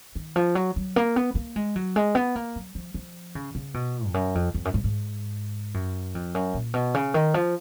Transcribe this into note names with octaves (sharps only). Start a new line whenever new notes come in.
D#3
F3
F#3
F#3
A#3
B3
A#3
G#3
F#3
G#3
B3
A#3
F#3
F3
F3
C#3
C#3
B2
F2
F#2
F2
F2
F#2
G#2
G#2
F#2
F2
F#2
A#2
B2
C#3
D#3
F3